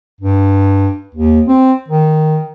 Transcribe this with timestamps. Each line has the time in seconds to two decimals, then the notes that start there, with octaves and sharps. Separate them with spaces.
0.21 G2
1.15 D#2
1.48 C4
1.89 D#3